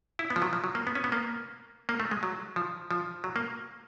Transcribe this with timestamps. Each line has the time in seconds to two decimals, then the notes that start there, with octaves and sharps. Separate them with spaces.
0.19 E4
0.30 B3
0.36 F3
0.42 F#3
0.53 F3
0.64 F#3
0.75 A#3
0.87 B3
0.95 C#4
1.04 B3
1.12 A#3
1.89 A#3
2.00 A3
2.11 G#3
2.23 F#3
2.56 F3
2.91 F3
3.24 F#3
3.36 A#3